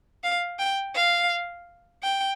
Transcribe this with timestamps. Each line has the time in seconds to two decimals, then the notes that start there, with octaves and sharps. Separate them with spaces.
0.24 F5
0.59 G5
0.95 F5
2.03 G5